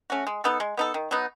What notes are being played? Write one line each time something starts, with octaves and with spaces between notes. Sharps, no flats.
A3 C#4 F#4
G#3
B3 D#4 A4
G#3
B3 D#4 A4
D#3
F#3 B3 D#4